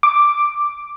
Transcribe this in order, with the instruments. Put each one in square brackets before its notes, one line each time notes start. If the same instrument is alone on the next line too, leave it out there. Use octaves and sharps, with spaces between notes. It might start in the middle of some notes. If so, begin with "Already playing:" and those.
[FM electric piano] D6